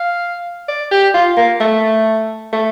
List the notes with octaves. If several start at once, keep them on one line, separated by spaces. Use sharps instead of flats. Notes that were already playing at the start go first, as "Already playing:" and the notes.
Already playing: F5
D5
G4
F4
A#3
A3
A3